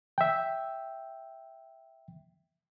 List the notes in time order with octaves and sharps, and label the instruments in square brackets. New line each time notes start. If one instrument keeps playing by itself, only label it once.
[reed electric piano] E5 G5